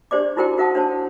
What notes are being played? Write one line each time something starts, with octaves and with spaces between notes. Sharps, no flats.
D4 G4 C5 D5 D6
D#4 E4 F#4 A#4 C5 G5
F#4 A#4 F5 F#5 A5 D#6
D4 C5 C#5 A5